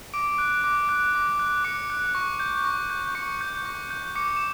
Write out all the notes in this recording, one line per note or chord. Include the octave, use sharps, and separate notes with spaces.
D6 D7
F#6
D6
F#6
D6
F#6
D6 C#7
F#6
C#6
G6
C#6
G6
C#6 C#7
G6
C#6
G6
D6 C#7
E7